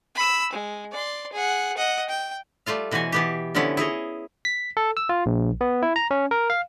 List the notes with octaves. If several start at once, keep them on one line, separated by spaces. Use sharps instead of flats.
B5 E6
G#3
D5 C6
G#4 F#5
D#5 F#5
G5
G3 A3 F4 F5
B2 E3 F#4 C5 G#5
E3 B3 G4
D3 F3 B3 C#4 E4
E4 G#4 C#5 D#5
B6
A4
E6
F4
A#1
B3
E4
A#5
C#4
A#4
F5